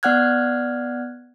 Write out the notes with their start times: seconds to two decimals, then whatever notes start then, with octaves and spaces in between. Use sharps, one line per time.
0.03 B3 D5 F#5 F6 F#6 G#6